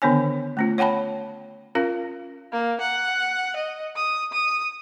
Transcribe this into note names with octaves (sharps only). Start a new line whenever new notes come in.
D3 D#3 B3 D4 C#5 G#5
A3 C#4 F4
C#5 F#5 G5 A5 B5
C#4 F4 A#4 F5
A#3
F#5
D#5
D#6
D#6